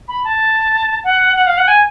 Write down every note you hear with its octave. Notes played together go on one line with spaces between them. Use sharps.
B5
A5
F#5
F#5
F5
F#5
G#5